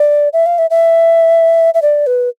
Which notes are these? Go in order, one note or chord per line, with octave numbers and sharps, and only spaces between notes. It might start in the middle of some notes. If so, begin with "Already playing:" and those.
Already playing: D5
E5
F5
E5
E5
E5
D5
B4